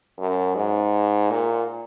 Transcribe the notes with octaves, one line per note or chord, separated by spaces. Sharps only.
F#2
G#2
A#2